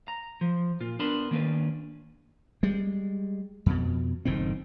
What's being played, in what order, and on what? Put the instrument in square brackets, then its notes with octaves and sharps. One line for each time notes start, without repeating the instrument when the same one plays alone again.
[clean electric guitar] A#5
F3
A#2 F4
B3 D4 A#4 A5 B5 C6
D#3 A#3 C#4 D4 B4
[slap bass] G3 G#3
F2 B2
F#1 A2 D#3 C4